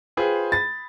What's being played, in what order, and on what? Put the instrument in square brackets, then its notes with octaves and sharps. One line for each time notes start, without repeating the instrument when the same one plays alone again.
[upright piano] F4 G#4 B4 C5 G5
B5 A6